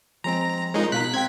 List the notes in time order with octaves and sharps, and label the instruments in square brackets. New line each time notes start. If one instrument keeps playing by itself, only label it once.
[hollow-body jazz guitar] F3 G#3 C4 [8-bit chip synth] A#5
[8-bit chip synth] G#3 D#4 [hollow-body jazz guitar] F4 A#4 C#5
[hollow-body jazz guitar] B2 F5 A#5 [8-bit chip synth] F#6 B6
[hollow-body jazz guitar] C4 G5 [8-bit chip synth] G#6 B6